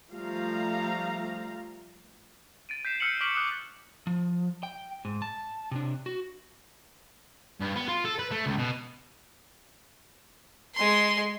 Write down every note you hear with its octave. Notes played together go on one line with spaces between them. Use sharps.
F3 G3 A3 F5 A#5
A6 D7 D#7
G6 B6 C7 E7
E6 F6 B6 C#7 F#7
C#6 D6 F6 B6 D7 F#7
D6 D#6 F#6
F3
G5
G#2
A5
C3 D4
F#4
G2
B3
F4
A4
B4
A3
C#2
B2
G#3 C6